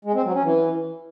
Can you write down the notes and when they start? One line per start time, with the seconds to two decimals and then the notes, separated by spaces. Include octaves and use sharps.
0.05 G#3
0.14 C4
0.24 F#3
0.34 C#4
0.44 E3